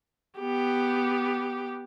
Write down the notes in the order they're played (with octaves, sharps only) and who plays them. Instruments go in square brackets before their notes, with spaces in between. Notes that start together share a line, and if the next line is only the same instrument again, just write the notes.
[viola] B3 G4